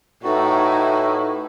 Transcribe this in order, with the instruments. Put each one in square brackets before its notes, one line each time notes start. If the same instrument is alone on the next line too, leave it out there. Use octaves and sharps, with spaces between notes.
[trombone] A2 [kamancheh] D#4 E4 [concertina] F#4 [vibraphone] A4 B4 G5